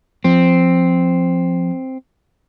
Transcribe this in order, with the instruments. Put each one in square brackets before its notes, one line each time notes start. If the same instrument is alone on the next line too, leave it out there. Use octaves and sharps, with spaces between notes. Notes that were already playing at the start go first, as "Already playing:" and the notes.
[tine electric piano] F3 [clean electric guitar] C4